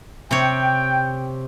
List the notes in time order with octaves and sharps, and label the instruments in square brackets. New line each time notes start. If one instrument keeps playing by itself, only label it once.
[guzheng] C3 C#5 [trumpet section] G5